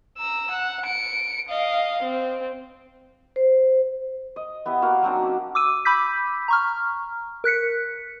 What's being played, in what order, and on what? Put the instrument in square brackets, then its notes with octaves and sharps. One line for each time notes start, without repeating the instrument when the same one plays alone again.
[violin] A#5 E6
F#5
C#7 D7
D#5 F5
C4
[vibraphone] C5
[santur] D#5
B3 E4 G4
A#3 F#4 F5
F#3 C4 D4 D#4
C#4
[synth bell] D6 E6 D#7
B5 D6 E6 G6 B6
A#5 C#6 F6
A#4 F#6 B6 C#7